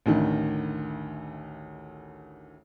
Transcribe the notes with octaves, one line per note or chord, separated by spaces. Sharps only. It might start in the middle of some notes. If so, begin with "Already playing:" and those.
A1 D2 D#3